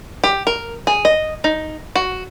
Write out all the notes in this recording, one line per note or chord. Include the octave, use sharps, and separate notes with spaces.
G4
A#4
G#4
D#5
D#4
F#4